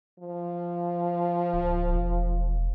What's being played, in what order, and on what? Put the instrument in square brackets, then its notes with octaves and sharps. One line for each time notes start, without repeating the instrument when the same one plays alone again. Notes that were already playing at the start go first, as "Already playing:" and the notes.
[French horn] F3
[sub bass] D1
E1